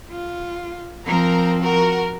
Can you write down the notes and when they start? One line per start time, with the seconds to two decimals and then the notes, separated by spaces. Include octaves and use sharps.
0.11 F4
1.05 F3 C4 A#4 A#5
1.61 F#4 A#4